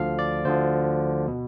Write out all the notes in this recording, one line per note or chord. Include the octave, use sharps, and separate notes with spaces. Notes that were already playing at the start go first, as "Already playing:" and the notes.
Already playing: D2 D3 F3 F5
D5
D2 D3 F3 C5
B2